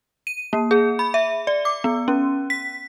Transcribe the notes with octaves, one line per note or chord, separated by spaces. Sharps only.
D#7
A#3
G#4
B5
E5
D5
D6
B3
C#4
B6